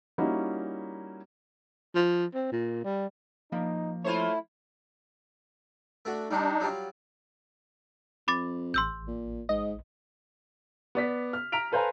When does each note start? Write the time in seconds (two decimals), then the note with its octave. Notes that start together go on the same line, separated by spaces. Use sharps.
0.18 G3 A#3 C#4 D#4 E4 F#4
1.95 F3
2.35 C4
2.52 A#2
2.84 G3
3.52 F3 A#3 D#4 B5
4.04 A3 E4 F4 C5 C#5
6.05 A3 D4 F#4
6.31 G3 D4 D#4 G4 C6
6.61 F#3 G3 F4
8.28 F2 B5 D6 A6
8.74 A1 C6 E6 G6
9.08 A#2
9.49 G#2 D#5
10.95 B3 D5 B6
11.33 F6
11.52 A#5 F6 B6 D7 F7
11.72 A4 B4 C5 F5 G#5 A#5